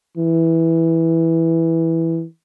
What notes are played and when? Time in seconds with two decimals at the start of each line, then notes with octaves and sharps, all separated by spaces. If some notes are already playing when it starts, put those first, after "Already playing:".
0.17 E3